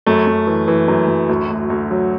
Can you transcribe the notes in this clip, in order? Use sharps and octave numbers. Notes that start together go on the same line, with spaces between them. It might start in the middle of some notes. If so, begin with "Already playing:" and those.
F#2 A3
F#2
E3
E3
F#2
F#2
D2
D2
D2
F#3